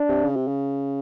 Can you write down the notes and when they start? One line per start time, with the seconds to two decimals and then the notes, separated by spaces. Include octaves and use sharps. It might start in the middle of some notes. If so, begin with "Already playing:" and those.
Already playing: D4
0.09 C3
0.24 C#3
0.36 C3
0.48 C#3